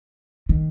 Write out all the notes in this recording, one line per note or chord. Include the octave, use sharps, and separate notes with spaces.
D#3